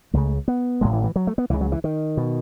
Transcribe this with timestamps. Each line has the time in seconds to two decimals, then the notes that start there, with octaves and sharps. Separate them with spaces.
0.13 C#2 C#3 A3
0.48 B3
0.81 A1 A2 G#3
0.93 E3
1.04 E3
1.16 F#3
1.27 A3
1.38 B3
1.50 C#2 C#3 E3
1.61 F#3
1.72 E3
1.84 D#3
2.17 B2